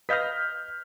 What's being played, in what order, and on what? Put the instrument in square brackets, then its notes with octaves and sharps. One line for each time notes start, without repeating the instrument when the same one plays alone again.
[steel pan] B4 D#5 F5 [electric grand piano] F6 G6 B6